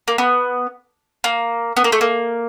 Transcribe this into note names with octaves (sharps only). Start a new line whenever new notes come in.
A#3
B3
A#3
B3
A#3
A3
A#3